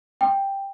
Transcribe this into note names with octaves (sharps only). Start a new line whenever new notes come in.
G5